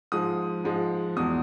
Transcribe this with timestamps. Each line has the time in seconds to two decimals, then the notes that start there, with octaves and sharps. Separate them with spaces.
0.12 G#2 F3 G#3 D#6
0.64 G#2 F3 G#3
1.17 E2 B2 G#3 D#6